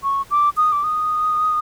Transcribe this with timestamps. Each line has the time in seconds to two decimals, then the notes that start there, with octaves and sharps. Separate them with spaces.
0.03 C#6
0.31 D6
0.57 D#6
0.72 D6
0.84 D#6